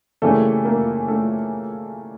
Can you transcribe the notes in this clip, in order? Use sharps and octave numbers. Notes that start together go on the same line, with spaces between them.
C#3 E3 G3 A3 A#3 A4
A#3 A#4
A3 A4